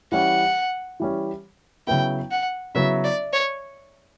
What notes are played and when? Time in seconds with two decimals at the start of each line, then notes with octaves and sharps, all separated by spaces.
0.12 E3 G3 C#4 F#5
1.00 E3 G3 C#4
1.87 C#3 F#3 B3 E4 G5
2.31 F#5
2.75 C#3 F#3 B3 E4 E5
3.04 D5
3.33 C#5